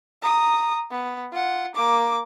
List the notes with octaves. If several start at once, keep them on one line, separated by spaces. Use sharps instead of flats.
A#5 D#6
B3
F4 F#5
A#3 D6